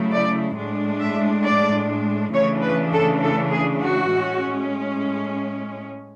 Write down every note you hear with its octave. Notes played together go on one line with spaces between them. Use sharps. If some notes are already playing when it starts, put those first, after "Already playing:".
Already playing: C#3 F#3 A3 E4
D5
A2 G#3 D4
E5
D5
C#3 E3 A3 D4 C#5
B4
A4
A4
G#4
F#4
A2 G#3 C#4